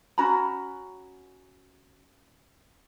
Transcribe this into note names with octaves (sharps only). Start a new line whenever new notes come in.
C#4 F#4 A#5 B5